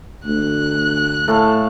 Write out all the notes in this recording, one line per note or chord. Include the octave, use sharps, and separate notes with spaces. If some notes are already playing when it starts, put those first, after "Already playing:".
D2 F#6
A2 A3 A4 F5